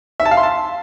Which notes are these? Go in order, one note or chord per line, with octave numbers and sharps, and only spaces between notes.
E5
A5
F5
C6
A5